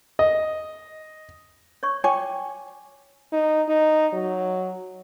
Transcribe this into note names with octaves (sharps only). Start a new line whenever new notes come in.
D#5
C#5 D5 C#6
C#5 G5 G#5 C#6 D6
D#4
D#4
F#3